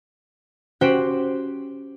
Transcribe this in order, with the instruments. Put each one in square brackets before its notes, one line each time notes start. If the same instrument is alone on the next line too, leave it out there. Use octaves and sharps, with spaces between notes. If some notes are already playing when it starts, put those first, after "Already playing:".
[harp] C#4 F#4 G4 C5 F#5 G5